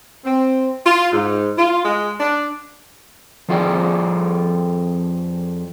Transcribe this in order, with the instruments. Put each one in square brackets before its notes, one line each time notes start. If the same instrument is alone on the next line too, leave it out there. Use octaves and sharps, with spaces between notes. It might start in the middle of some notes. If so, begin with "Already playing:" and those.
[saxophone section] C4
F4
G#2
F4
G#3
D4
[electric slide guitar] F2 F3 F4 G#4 D5 G5